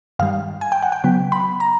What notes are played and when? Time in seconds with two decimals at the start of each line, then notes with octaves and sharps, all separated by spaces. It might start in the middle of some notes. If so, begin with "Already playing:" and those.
0.19 G2 D#3 G3 F5
0.61 G#5
0.72 G5
0.83 F#5
0.92 G5
1.04 C#3 F#3 B3
1.32 B5
1.60 A#5